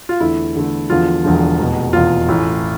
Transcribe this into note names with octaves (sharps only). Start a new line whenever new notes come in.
F4
E2 D3 A3 E4
E2 D3 A3
E1 E2 D3 F3 F4
E1 E2 D3 F3
F1 E2 B2
F1 E2 B2 F4
A1 A2 E3